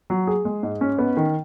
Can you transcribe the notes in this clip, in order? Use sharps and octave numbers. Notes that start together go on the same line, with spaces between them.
F#3
G#4
G#3
G#2
C#4
B3
D#3